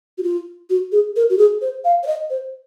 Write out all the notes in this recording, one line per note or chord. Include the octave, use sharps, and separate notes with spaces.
F#4
F4
F#4
G#4
A#4
F#4
G#4
C5
F5
C#5
D#5
C5